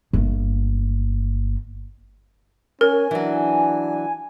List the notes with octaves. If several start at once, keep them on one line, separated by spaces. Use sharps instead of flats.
G1 A#3
C#4 A#4 G#5
E3 F#3 D4